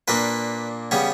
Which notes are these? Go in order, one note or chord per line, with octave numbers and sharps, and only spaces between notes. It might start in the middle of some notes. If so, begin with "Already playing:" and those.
A#2 A#3 D4 B4
C#3 G3 B3 C#5